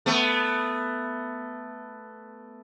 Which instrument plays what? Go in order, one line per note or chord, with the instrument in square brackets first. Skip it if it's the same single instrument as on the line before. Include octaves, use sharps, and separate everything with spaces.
[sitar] A3 B3